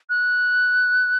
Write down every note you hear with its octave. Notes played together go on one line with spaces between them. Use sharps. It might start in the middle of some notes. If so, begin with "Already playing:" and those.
F#6